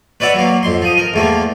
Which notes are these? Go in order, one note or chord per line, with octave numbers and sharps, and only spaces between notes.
B4 C#5 D5 E5 F#5
F#3 A#3
F2 C6
F3 D#6
A#4
E2 A3 A#3